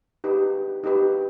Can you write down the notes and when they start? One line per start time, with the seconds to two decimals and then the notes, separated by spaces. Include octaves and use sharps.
0.24 D#4 G4 B4
0.84 D#4 G4 B4